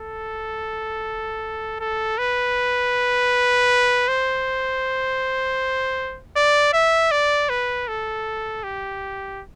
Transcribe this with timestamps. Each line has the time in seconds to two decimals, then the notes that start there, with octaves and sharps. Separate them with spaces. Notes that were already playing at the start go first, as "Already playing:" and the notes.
Already playing: A4
1.80 A4
2.18 B4
4.08 C5
6.36 D5
6.73 E5
7.11 D5
7.50 B4
7.88 A4
8.63 G4